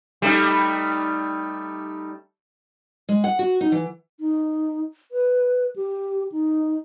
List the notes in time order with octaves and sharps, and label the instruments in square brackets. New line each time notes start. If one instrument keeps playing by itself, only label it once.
[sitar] G3 A3 D#4
[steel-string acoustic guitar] G#3
F#5
F#4
D#4
E3
[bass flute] D#4
B4
G4
D#4